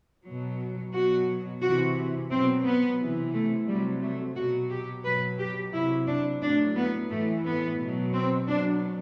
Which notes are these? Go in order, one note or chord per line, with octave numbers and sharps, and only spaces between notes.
B2 F#3
B2 F#3 F#4
C3 E3 F#4
B2 F#3 C4
B3
C3 E3
A3
C3 F#3 G3
A3
B2 F#3 F#4
G4
B2 F#3 B4
G4
C3 F#3 E4
D4
A2 F#3 D4
B3
A2 E3 A3
B3
B2 F#3
C4
B2 F#3 D4